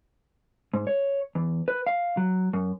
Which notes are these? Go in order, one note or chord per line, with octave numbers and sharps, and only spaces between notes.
G#2
C#5
E2
B4
F5
F#3
F#2